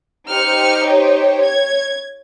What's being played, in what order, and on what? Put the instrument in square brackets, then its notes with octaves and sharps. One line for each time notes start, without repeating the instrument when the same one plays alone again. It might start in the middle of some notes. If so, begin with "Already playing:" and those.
[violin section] D#4 G4 C5 [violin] F6 C#7
[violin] C#5
[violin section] G#6